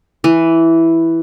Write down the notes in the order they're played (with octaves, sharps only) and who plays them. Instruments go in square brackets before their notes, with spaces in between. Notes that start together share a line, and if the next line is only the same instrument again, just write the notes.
[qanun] E3